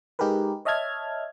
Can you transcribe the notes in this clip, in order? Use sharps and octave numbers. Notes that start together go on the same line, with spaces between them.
G#3 D#4 G4 G#4 A#4 B4
C#5 D#5 E5 A5 F6 G#6